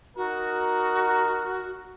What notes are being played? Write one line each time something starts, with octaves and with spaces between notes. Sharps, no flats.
D#4 F#4 A#4